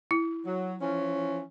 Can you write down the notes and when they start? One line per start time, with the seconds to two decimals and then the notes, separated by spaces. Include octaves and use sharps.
0.11 E4
0.46 F#3
0.81 E3 F3 C#4